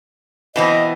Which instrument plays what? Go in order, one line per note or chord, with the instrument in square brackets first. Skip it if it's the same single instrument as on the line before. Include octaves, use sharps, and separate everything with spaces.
[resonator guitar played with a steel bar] B2 E3 C4 [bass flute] D#5